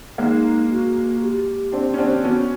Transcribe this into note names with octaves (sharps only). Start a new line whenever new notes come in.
G#3 A#3 D#4
F#4
G4
C4 D4
C#4
C4 D4
B3 C#4 F#4